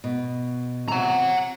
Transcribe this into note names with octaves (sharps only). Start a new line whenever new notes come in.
B2
C3 F#5 A#5